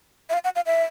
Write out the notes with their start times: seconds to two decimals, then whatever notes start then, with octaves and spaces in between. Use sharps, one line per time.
0.30 E5
0.33 F5
0.44 F#5
0.56 F5
0.66 E5